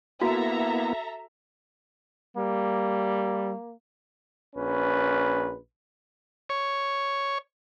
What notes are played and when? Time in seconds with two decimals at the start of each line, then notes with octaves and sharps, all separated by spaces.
0.22 A#3 B3 E4 F#4 A4 E5 A#5
2.37 G3 A#3
4.56 A#1 C#4 B4
6.49 C#5